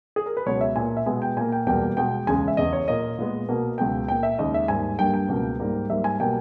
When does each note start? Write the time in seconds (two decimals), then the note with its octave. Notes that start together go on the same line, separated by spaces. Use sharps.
0.16 G#4
0.26 A#4
0.37 B4
0.46 C#2 B2 G#3 B3 C#5
0.61 E5
0.76 A#2 A#3 G#5
0.97 E5
1.06 B2 G#3 B3 G#5
1.22 G5
1.36 A#2 A#3 G#5
1.52 G5
1.66 E2 B2 G3 A#3 G5
1.97 B2 G#3 B3 G5
2.27 E2 C#3 G#3 G#5
2.48 E5
2.57 E2 C#3 E3 D#5
2.73 C#5
2.88 A#2 A#3 D#5
3.18 A#2 G#3 B3
3.49 B2 A#3
3.78 C#2 B2 G#3 B3 G5
4.08 A#2 A#3 G5
4.23 E5
4.39 D#2 C#3 G#3 D#5
4.54 E5
4.68 G#2 G3 A#3 G#5
4.99 G2 G3 A#3 G5
5.14 G5
5.29 C#2 B2 A#3
5.60 G#2 G3 A#3
5.90 G#2 G3 A#3 E5
6.04 G#5
6.20 B2 G3 A#3 G5